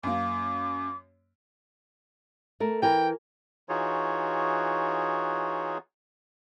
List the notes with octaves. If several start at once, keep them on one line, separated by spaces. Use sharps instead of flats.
F#2 A#3 D6
A3 A#4
E3 A#4 G5 G#5
E3 D#4 F4 F#4 G#4 C#5